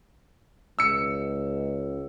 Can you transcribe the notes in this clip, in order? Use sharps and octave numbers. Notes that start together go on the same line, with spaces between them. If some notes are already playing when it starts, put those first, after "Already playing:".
C#2 E6 C#7